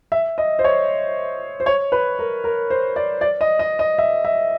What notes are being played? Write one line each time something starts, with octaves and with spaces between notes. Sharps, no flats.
E5
D#5
C5
C#5
C5
C#5
B4
A#4
A#4
C5
D5
D5
D#5
D#5
D#5
E5
E5